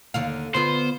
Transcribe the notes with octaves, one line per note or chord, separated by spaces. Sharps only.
D#2 D3 F5
D3 B3 F4 C5